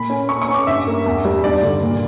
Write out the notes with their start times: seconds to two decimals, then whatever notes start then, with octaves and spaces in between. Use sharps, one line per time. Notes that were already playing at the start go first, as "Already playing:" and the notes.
Already playing: A#2 B5
0.10 C#4
0.29 C#4 C#6
0.42 C#6
0.48 C#4
0.54 D6
0.67 G2 E5
0.87 A#3
1.06 E2
1.25 G3
1.44 G2 D5
1.63 D3
1.82 A#2